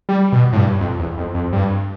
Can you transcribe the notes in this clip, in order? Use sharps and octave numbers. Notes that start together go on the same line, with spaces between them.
G3
B2
A2
G2
F2
E2
F2
F2
G2